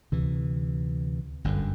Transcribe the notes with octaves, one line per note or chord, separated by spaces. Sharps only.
D2 C3 E3
G1 F#2 D3